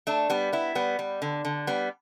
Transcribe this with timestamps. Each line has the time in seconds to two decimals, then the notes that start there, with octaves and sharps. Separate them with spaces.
0.07 A3 D4
0.30 G3 B3
0.53 B3 E4
0.75 G3 B3
0.99 G3
1.22 D3
1.45 D3
1.67 G3 B3